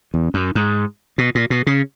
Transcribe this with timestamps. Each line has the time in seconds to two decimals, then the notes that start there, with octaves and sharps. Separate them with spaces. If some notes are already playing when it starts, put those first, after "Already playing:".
0.14 E2
0.34 F#2
0.55 G#2
1.18 B2
1.35 A#2
1.50 B2
1.67 C#3